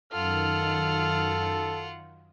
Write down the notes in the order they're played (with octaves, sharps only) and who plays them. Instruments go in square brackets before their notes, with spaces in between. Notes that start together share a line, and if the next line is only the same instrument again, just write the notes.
[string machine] F#2 D#3 [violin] F4 F#5 [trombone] A4 [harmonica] F6